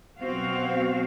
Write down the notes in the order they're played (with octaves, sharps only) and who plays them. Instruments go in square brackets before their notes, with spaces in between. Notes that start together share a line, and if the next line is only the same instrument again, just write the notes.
[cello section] B2 F#3 C4 F#4 F5